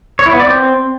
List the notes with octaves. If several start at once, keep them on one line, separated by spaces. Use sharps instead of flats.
C#5
E4
B3
D5
C4